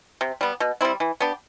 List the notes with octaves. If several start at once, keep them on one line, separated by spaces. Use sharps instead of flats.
C3
G3 B3
B2
G3 C4 E4
E3
B3 D4 G4